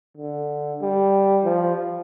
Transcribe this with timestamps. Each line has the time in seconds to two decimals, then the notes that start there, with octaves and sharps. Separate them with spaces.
0.17 D3
0.82 G3
1.44 F3